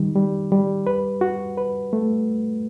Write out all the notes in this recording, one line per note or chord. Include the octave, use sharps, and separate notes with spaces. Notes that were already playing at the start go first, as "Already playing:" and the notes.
Already playing: D#3 G3
G3
G3
B4
F#4
B4
A3